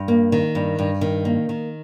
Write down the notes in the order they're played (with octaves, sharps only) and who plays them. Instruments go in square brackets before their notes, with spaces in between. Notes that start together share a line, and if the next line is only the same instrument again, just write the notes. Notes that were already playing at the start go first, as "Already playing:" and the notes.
Already playing: [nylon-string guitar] G2
A#3
D#3
G2
G2
D#3
A#3
D#3